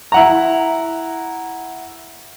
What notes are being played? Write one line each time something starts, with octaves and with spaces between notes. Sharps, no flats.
E4 F#5 A#5